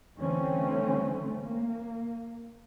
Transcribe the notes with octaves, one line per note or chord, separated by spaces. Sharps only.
D3 E3 G3 A3 C4 C#4
A#3